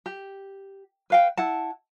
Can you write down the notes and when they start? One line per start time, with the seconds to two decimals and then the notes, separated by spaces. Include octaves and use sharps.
0.06 G4
1.10 B4 F5 G5
1.37 E4 F#5 A5